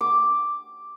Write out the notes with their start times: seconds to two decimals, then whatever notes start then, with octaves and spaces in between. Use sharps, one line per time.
0.01 D6